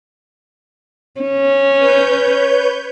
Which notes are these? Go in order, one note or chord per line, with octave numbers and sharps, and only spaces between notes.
C#4
B4 C#5 G6